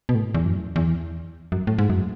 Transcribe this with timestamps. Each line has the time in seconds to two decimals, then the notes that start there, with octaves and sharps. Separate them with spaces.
0.09 B2
0.15 A2
0.34 E2
0.45 F#2
0.76 E2
1.52 F#2
1.67 A2
1.78 G#2
1.90 F#2